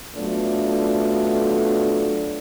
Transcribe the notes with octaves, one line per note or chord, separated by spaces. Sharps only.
F#3 A3 B3 D4 F4